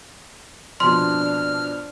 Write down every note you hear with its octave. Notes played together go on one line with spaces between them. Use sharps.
F2 B2 D4 C6 F6